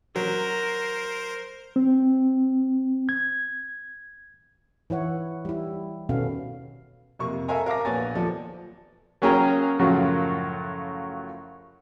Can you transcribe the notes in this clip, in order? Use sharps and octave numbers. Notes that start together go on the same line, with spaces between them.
F#3 A#4 C5
C4
G#6
E3 E4 C#5 F#5
G3 E4
B2 D#3 B3 C#4 A4 F5
F2 C3 A#3 C#6
A4 A#4 E5 F5 G#5 A#5
A#4 F5 A5 D6 A#6
A#1 B3 C#5 G#5 A6
D#2 F3 A4 D5
F#3 A#3 C#4 G#4 G5 A#5
F#2 A2 C#3 F3 F#3